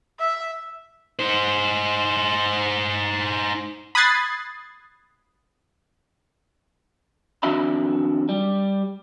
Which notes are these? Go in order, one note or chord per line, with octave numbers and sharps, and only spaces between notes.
E5
D#4 C5
B5 D#6 F#6 G#6 A6 C7
F2 D#3 D4 F#4 E5 B5
G3